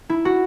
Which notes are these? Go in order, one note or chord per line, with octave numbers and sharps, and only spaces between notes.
E4
F#4